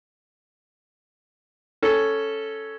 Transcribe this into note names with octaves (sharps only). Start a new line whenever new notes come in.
C#4 A4